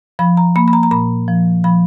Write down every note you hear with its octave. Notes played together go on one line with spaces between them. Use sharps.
F3 B5
A#5
A#3 B5
B5
A#5
A#5
A#2 B5
F3
F3 B5